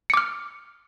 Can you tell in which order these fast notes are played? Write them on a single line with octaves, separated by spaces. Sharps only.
C#7 D6 F6